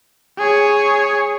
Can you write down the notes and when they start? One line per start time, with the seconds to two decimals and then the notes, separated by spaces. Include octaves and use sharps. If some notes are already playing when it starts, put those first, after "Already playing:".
0.38 G#4 C#5